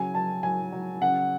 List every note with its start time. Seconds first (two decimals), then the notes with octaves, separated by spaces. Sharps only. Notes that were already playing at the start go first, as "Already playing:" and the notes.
Already playing: C#3 F#3 G#5
0.14 F#3 A5
0.43 F#3 G#5
0.72 F#3
1.01 C#3 F#5